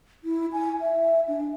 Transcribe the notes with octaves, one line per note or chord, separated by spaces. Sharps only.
E4
G#5
E5
D4